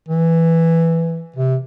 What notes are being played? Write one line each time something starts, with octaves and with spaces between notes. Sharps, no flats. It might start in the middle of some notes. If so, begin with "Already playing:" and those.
E3
C3